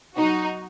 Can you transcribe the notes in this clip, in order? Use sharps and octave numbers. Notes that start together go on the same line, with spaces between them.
B2 F#3 D#4 F#4